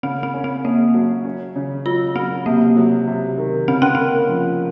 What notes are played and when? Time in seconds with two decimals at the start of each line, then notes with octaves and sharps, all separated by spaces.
0.03 C#3 C4
0.23 C4
0.34 C#4
0.44 C4
0.64 A#3 C#4
0.94 F#3
1.25 C#4
1.56 C#3
1.86 F#3 F4
2.16 F#3 C4
2.46 C3 A#3
2.77 F#3
3.07 C3
3.38 D#3
3.68 C#3 C4
3.82 C#4
3.95 A#3 C4
4.29 F3